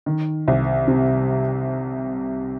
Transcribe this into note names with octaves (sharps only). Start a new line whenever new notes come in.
D#3
C2
C3